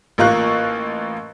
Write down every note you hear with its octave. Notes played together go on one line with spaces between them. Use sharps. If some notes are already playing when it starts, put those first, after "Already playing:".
A1 A#3 F4 C#6 F#6